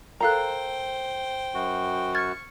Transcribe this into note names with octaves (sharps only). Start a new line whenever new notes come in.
A4 A#4 C5 F5 G5 A#5 F#6
F#2 F#4
C#6 F6 G#6 A6